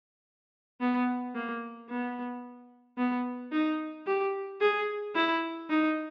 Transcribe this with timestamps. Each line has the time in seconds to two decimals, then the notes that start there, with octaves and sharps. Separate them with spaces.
0.80 B3
1.34 A#3
1.89 B3
2.98 B3
3.52 D#4
4.06 G4
4.60 G#4
5.15 E4
5.69 D#4